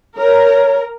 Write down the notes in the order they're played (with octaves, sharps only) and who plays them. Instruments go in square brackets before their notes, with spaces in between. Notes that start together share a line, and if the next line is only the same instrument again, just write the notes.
[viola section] A#4 [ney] C#5